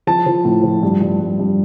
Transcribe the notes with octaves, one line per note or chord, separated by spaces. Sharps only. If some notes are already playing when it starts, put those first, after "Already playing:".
F3 A5
F3
A2
F3
G2
G2
G2
G2